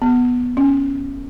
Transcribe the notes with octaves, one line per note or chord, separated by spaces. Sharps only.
B3
C#4